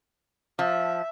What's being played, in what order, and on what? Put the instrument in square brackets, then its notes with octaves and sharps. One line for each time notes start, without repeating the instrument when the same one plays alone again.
[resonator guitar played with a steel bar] F3 [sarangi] E5